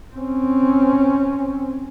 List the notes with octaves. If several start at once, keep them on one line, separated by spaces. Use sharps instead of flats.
C4 C#4